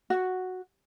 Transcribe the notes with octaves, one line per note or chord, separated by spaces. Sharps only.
F#4